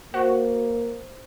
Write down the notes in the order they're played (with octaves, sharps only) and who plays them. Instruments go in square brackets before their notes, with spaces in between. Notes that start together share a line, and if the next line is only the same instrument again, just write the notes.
[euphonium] A#3 [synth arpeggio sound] F#4 [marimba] C5